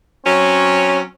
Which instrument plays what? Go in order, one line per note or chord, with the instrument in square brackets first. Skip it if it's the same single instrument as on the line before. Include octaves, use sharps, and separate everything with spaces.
[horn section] F#3 C4 C#4